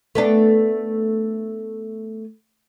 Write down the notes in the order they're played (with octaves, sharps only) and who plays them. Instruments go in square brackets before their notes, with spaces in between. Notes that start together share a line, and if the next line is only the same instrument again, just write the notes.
[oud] A3 B3 D4